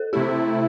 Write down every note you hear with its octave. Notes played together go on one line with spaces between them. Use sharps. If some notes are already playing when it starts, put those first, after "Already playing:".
Already playing: A4 C5
C3 A3 E4 G4